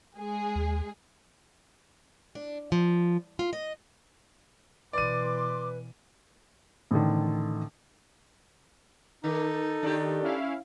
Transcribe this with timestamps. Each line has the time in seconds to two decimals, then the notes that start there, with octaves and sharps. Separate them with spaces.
0.17 G#3 G#4
0.55 D#2
2.35 D4
2.72 F3
3.39 F4
3.53 D#5
4.93 B2 E3 B4 D5 C6 D6 D#7
6.91 A1 D3 D#3
9.24 D#3 D#4 A4
9.83 D#3 D4 G4
10.23 C#4 E4 F5